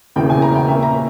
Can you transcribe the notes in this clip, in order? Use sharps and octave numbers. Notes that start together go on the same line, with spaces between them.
E1 E2 C#3 E3 A#3 G5
G#5
A#5
G5
A#2 A#3 C#4 E5
A#5